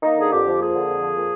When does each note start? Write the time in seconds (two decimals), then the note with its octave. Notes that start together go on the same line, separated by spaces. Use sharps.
0.03 A#3 D#4
0.17 D3 G#4
0.32 F2 G4
0.45 F3
0.60 A#3 G#4
0.74 D3
0.88 F2
1.02 F3
1.16 A#2